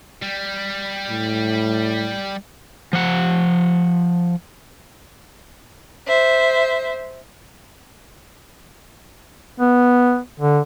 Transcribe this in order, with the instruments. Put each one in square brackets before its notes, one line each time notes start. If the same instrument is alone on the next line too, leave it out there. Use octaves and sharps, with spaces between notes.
[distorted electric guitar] G3
[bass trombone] A2
[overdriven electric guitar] F3 F#5
[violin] C5 E5
[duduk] B3
D3